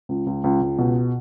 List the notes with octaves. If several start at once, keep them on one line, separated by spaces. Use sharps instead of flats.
C#2
C#2
C#2
C#2
B2